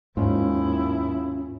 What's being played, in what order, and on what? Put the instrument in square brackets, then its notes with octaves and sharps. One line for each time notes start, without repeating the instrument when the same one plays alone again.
[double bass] D#2 E4 [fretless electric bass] G#2 [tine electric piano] C#4 F4